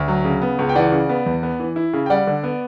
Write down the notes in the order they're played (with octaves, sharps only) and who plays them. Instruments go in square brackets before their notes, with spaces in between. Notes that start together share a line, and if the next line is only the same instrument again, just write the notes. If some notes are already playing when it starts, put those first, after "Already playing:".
Already playing: [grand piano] D2
F#3
C#3
B3
C#2
G5
E3 D5 F#5
C#3
B3
E2
B3
E3
E4
C#3
G5
G3 D5 F#5
D3
B3